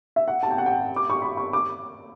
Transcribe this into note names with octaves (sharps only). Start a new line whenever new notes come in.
E5
F#5
A5
G5
F#5
G5
D6
C#6
B5
C#6
D6